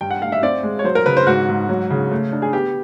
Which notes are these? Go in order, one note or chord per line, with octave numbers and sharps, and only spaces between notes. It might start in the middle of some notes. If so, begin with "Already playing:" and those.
G2 G5
F#5
A3 F5
E5
C4 D5
G#3
C#5
F#3 C5
A#4
C#3 B4
C5
G#2 F#4
G#2
F#3
C#3
A3
D4
G#4
B3 G4